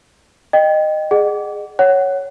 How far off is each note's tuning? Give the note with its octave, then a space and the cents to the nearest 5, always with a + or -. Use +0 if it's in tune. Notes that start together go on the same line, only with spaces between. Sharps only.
D#5 -15 G5 +0
G#4 +0 D#5 -40 F#5 +15
C#5 +0 F#5 +10